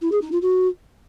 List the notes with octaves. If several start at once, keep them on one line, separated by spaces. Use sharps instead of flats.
E4
G#4
D#4
F4
F#4